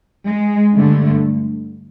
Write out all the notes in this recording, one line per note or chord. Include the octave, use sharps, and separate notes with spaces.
G#3
G2 D3 A3